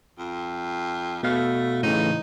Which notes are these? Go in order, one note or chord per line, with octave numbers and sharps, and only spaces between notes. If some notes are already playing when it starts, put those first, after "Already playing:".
F2
B2 A3 F5
A2 C#3 E3 D#4